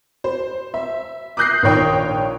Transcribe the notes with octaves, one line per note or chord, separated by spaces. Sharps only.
C5
E5
D6 D#6 F#6 G6 A#6 C7
A#1 D#3 A#4 C#5 G5 D#6